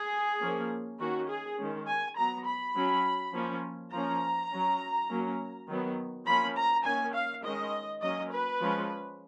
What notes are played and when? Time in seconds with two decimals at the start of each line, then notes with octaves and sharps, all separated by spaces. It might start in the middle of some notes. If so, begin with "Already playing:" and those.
Already playing: G#4
0.41 F3 A#3 C#4
0.99 D#3 A#3 C#4 F#4
1.29 G#4
1.58 D#3 G#3 C#4
1.87 G#5
2.17 F#3 B3 A#5
2.46 B5
2.75 F#3 C#4
3.34 F3 A#3 C#4
3.92 F3 A#3 C#4 A#5
4.51 F#3 C#4
5.09 F#3 A#3 C#4
5.68 D#3 F#3 B3
6.26 F3 A#3 C#4 B5
6.55 A#5
6.84 D#3 A#3 C#4 G#5
7.13 F5
7.43 D#3 G#3 C#4 D#5
8.01 F#3 A#3 C#4 D#5
8.31 B4
8.61 F3 G#3 C#4